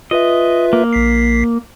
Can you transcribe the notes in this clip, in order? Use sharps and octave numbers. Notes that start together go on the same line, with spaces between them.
F4 B4 D#5 E5
A#3
A#1 B6 C7